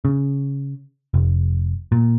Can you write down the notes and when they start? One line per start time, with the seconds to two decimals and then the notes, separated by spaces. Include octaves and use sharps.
0.05 C#3
1.14 F1
1.92 A#2